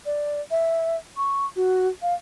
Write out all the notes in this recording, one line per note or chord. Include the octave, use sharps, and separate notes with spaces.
D5
E5
C#6
F#4
F5